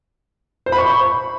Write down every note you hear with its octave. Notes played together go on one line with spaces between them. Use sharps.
C5
B5
C#6